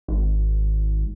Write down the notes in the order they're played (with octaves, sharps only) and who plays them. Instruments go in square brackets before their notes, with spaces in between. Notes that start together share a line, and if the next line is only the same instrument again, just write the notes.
[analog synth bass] G#1